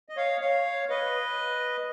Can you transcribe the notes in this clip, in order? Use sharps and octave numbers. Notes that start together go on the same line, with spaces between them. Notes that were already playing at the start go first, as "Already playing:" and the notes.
D#5
C#5 F5
C#5 F5
B4 D#5